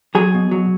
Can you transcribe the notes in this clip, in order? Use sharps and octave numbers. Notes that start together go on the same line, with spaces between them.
F#3 G#4
B2
F#3